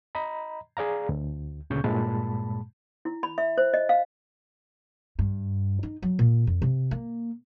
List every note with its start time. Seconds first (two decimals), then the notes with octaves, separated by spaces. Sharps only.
0.15 D#5 A#5 B5
0.77 G#4 D5 F5 A#5
1.09 D2
1.70 D2 A#2 C#3 C#6 G6
1.84 G2 A#2 G#3 A5 B5
3.05 E4
3.23 B5
3.38 E5
3.58 C5
3.74 D#5
3.89 F5
5.19 G2
5.83 D#4
6.02 F#3
6.19 A#2
6.47 F2
6.62 C3
6.91 A#3